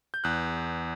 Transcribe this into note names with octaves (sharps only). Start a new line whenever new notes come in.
G6
E2 F#6